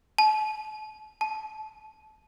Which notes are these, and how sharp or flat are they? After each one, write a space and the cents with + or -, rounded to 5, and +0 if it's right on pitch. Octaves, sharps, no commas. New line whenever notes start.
A5 -40
A5 -25